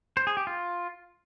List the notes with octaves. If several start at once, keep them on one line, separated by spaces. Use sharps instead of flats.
C5
G#4
G4
F4